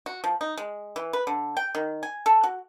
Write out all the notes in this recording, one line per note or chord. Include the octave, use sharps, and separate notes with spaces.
F#4
F3
D#4
G#3
E3
B4
D3
G5
D#3
G#5
A4
F#4